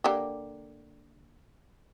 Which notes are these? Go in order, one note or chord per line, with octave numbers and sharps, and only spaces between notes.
D3 A#3 G4